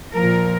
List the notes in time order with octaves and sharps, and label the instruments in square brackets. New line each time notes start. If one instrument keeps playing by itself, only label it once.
[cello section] A#2 F3 A#4